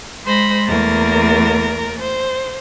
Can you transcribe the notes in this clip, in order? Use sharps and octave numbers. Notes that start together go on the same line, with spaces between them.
G#3 C5 B5 A#6
E2 A3 A#3 A#4 A6
C5